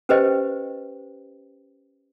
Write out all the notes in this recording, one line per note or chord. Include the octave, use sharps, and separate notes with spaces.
C#4 G4 B4 C5 D#5 G5